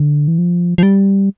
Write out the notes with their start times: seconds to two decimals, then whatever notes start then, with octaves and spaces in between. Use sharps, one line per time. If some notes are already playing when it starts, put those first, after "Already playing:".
Already playing: D3
0.28 E3
0.38 F3
0.78 F3
0.83 G3